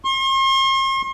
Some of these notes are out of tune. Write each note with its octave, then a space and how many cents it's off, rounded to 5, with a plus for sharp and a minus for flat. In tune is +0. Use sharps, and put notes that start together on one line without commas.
C6 +45